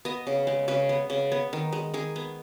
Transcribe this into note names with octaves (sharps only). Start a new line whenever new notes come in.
B3 D#5
C#3
G#3
C#3 B4
B3
C#3
B3
D#3
G#3
D#3 G#4
B3